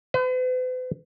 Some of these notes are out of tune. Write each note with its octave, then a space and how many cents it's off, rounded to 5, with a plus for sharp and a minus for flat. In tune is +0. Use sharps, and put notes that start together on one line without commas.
B4 +45